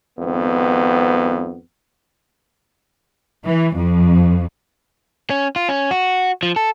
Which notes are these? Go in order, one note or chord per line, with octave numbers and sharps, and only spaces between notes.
G#1 F2 B3
E3
F2
C#4
F4
C#4
F#4
F3
A4